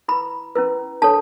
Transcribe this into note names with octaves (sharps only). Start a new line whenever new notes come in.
E4 B4 B5
C#4 E4 B4
D4 A4 C#5 A5